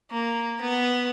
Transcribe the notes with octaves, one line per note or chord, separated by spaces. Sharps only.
A#3
B3